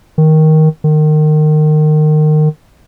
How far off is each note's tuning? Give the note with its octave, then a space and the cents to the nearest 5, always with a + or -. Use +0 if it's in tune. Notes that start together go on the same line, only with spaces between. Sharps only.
D#3 +10
D#3 -25